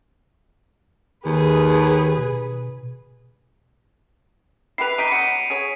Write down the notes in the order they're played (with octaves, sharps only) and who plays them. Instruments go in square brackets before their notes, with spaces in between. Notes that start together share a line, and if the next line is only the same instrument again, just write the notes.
[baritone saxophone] D#2 [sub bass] D#3 [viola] G#4 B4
[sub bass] B2
[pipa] E4 G4 B4 [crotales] C7 F7
[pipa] C3 E3 D#4 [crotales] B6 D7 D#7
[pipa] F#3 B3 [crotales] C#7 D#7
[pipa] G#4 C#5